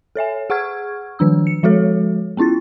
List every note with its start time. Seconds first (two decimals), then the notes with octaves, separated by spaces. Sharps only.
0.16 A4 C#5 E5 G#5
0.50 G#4 F#5 C#6 F6 G#6
1.19 D#3 F3 D4 E6
1.47 C#7
1.63 F3 G#3 F#4 A4 C#5
2.37 B3 C#4 E4 F4 A6